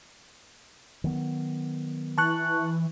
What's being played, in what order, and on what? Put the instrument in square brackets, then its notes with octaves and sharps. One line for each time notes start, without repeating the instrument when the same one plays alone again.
[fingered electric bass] D#3 F#3 B3
[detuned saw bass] E3 [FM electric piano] A5 C#6 F#6